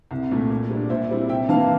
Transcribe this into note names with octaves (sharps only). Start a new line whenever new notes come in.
C2
A#2 A3
A#2
G3 D4
A#2 C5 E5
G3 C4 E4
C3 E5 G5
E3 F5 A5
A#3